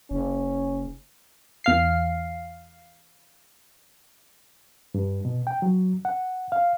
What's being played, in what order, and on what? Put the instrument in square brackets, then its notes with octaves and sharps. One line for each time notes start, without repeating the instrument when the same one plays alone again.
[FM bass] F#1 [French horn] C#4
[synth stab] E2 F5 C7
[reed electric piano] G2
B2
G5
F#3
F#5
F5